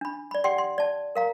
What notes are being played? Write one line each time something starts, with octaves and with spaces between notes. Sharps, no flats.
D4 B5
D5 B5
G4 D5 F#5 G5 C6
C6
D5 A5
A#4 F5 A#5